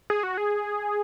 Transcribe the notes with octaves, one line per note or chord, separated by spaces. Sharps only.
G#4
F#4
G#4